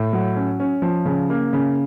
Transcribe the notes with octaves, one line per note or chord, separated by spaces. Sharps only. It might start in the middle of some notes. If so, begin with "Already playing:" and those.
Already playing: A2
F#3
C#4
C#4
F3
C#3
A#3
C#3